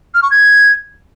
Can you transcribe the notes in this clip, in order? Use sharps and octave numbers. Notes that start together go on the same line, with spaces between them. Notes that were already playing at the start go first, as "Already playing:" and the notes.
F6
C#6
G#6